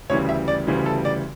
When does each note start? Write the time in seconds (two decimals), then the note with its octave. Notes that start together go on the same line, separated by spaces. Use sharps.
0.10 D2 C#3 E3 G3 C#5
0.29 E5
0.48 D5
0.67 D2 C#3 E3 G3
0.86 A4
1.05 D5